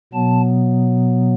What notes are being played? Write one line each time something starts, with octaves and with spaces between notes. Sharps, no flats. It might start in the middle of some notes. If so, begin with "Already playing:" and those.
B2 F#3 B3 A5